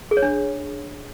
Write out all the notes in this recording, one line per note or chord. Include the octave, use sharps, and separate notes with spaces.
G#4
C#5
D4